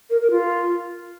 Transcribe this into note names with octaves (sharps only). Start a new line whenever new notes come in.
A#4
A#4
F4